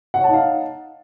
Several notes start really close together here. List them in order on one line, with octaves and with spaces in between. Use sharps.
F#5 C#5 A5 D#4 F5